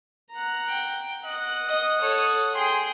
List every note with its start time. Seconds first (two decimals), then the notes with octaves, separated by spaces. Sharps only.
0.31 F#5 A#5
0.68 G5
1.24 D#5 F#5 F#6
1.69 D#5 D#6
2.01 A4 C#5
2.55 G#4 G5 G#5 C6